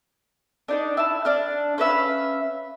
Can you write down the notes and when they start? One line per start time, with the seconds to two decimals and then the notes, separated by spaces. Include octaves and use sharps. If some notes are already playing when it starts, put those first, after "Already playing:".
0.68 D4 D#4 D5
0.97 E4 A5
1.25 D4 F6
1.78 C#4 B4 E5 F5